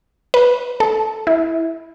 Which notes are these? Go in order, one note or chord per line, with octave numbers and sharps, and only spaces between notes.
B4
A4
E4